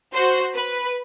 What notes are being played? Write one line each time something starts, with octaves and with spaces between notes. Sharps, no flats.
F#4 C5
B4